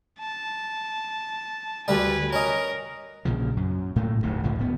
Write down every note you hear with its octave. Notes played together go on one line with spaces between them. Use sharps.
A5
D2 G3 B4 D5 G#5
C#4 A#4 D#5
A#1 A#2 C#3 F3
F#2
A2 A3 A#3
F1 D2 G#2 C3
G1 C#2 A2 F3
D1 B3